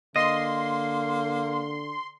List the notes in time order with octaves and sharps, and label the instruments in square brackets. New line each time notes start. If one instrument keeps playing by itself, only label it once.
[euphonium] D3 [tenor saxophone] A#3 [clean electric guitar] D#5 [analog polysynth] C6